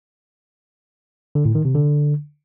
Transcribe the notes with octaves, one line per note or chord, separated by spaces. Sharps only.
D3
A2
D#3
C3
D3